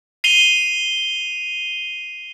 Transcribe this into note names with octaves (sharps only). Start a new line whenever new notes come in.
C7 D#7 F7 G7